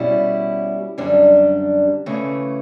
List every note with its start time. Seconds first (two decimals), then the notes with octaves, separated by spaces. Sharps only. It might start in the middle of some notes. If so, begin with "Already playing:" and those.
Already playing: B2 G3 C#4 E4
0.98 F#2 D3 G3 D4
2.06 C#3 E3 A3